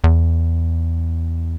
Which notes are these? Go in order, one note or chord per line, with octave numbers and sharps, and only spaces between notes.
E2